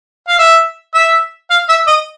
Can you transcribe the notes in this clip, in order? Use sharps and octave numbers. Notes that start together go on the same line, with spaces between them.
F5
E5
E5
F5
E5
D#5